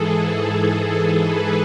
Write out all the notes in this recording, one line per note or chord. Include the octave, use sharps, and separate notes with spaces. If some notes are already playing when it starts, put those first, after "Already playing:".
Already playing: G#2 E3 G#4 A4
B4